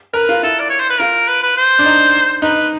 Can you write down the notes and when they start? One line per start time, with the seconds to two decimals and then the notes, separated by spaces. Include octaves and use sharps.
0.13 A#4 B4
0.29 F4
0.43 E4 A4
0.59 D5
0.69 C#5
0.80 C5
0.89 B4
1.00 F4 A#4
1.28 B4
1.42 B4
1.57 C5
1.79 D4
1.85 D#4
2.42 D#4 B4